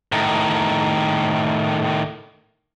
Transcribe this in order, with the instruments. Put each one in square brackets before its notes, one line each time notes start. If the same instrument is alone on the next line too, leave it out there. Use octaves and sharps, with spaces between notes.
[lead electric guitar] A2 D#3